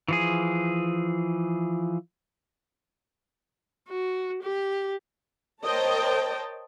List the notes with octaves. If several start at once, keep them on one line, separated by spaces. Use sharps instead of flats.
E3 F3 G#4
F#4
G4
A#4 C5 C#5 D#5 G5 A5